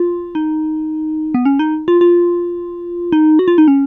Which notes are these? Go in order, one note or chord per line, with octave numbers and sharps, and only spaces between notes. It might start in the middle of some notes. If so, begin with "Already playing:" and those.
Already playing: F4
D#4
B3
C#4
D#4
F4
F4
D#4
F#4
F4
D#4
C#4